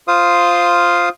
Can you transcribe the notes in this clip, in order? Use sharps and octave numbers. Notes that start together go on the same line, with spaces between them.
F4 C5 F5 D#6